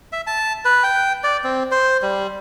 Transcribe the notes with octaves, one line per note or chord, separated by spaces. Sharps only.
E5
A5
B4
G5
D5
C4
C5
G3